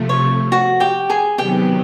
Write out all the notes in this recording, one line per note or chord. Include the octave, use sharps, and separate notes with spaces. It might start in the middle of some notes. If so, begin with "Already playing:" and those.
Already playing: C3 F3 A3
C#5
F#4 F#5
G4 G5
G#4 G#5
C3 D#3 F#3 B3 G4 G5